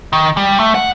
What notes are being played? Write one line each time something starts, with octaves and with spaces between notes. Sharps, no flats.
D#3
G3
A3
F#5